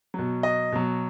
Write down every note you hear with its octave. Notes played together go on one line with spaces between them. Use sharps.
B2 F#3
D#5
B2 F#3